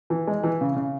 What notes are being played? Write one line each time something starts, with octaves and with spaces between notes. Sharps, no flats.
E3
G#3
E3
C#3
C#3